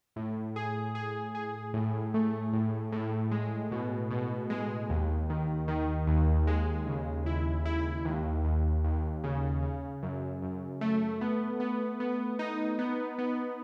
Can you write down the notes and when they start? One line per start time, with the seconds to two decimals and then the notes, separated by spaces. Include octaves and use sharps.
0.16 A2
0.56 G#4
0.95 G#4
1.35 G#4
1.73 A2
2.14 A3
2.53 A2
2.92 A2
3.32 G#3
3.72 B2
4.11 B2
4.50 G#3
4.90 D#2
5.30 D#3
5.68 D#3
6.07 D#2
6.47 G#3
6.87 C#3
7.26 E4
7.65 E4
8.05 D#2
8.45 D#2
8.84 D#2
9.24 C#3
9.63 C#3
10.02 F#2
10.42 F#2
10.81 A3
11.21 B3
11.60 B3
12.00 B3
12.39 D#4
12.79 B3
13.18 B3